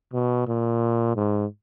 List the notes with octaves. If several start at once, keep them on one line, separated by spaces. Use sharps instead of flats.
B2
A#2
G#2